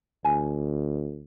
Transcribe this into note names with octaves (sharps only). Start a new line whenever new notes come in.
D2 G#5